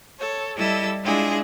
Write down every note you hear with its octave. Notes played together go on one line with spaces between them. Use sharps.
A4 C#5
G3 E4 A4 D#5 E6
G#3 D4 E4 F4 G#4